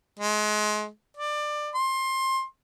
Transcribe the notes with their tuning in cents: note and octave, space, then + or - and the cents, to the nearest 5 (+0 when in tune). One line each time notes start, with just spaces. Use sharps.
G#3 +30
D5 +20
C6 +20